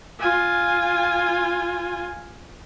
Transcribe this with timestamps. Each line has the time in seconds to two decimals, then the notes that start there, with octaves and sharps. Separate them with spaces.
0.19 F4 G#5